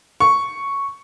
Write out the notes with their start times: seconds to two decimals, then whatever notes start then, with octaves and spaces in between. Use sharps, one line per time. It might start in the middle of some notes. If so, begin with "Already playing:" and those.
0.20 C#6